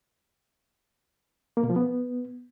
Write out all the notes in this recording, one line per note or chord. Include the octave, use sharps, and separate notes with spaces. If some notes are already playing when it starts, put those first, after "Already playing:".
A#3
B2
F3
B3